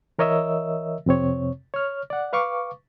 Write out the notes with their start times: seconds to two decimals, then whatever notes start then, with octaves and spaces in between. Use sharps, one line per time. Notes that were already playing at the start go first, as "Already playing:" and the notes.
0.19 E3 A#4 C#5 D#5 E5 E6
1.06 F2 C3 C4 C#5
1.74 C#5 F6
2.10 D5 F#5
2.33 B4 F5 C#6 D6